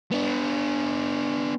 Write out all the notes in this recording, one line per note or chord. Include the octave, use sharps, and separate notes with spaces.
B3 D4